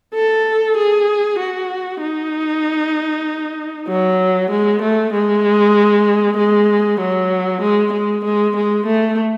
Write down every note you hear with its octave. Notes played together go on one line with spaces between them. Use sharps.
A4
G#4
F#4
D#4
F#3
G#3
A3
G#3
G#3
F#3
G#3
G#3
G#3
G#3
A3